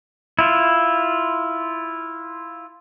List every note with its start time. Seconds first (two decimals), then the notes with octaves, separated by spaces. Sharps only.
0.39 E4 F4